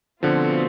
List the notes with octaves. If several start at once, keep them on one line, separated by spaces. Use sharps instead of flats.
B2 D3 F3 A3 C4 F4